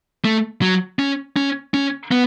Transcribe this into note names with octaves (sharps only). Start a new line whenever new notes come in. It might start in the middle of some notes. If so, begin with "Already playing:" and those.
A3
F#3
C#4
C#4
C#4
B3